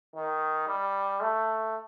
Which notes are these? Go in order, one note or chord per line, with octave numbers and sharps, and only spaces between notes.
D#3
G3
A3